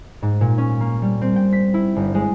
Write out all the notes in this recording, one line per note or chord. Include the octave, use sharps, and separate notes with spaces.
G#2
A#2
C#4
A#3
G3
C4
G5
B6
E4
G1
G#3